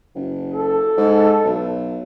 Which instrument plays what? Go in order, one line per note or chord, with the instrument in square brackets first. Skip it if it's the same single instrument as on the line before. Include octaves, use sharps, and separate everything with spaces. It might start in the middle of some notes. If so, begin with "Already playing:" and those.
[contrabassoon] F#1
[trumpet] A4
[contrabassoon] G#2
B1